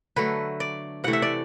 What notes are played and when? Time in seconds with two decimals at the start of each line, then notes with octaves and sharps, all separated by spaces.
0.16 D3 F#3 A3 B4
0.60 D5
1.04 C3 E3 A3 F#5
1.13 E5
1.22 D5